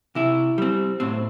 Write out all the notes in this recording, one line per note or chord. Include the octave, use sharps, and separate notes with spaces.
C3 E4
G3 C4
A2 C4